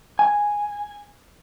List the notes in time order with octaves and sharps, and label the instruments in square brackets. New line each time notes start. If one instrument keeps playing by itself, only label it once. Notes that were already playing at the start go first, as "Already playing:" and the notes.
[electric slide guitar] G#5